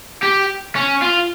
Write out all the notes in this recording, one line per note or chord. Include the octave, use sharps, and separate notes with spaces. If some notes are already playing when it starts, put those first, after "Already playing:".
G4
C#4
F4